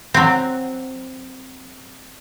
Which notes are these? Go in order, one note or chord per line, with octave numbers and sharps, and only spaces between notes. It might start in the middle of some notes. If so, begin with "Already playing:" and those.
F#3 C4